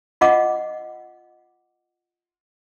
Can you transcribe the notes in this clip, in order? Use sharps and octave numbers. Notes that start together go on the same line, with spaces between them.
F4 D#5 F#5 D6